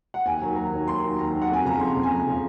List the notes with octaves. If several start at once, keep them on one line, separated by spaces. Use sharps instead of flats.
F#5
D#2 G#5
D#3 F#3
D#2 A#5
D#3 F#3
D#2 C6
D#3 F#3
D#2 A#5
D#3 F#3
F#5
F2 G#5
C#3 F3 A#5
F2 C6
C#3 F3
G#5
F2 A#5
C#3 F3